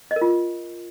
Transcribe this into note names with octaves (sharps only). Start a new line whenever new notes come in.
D#5
A#4
F4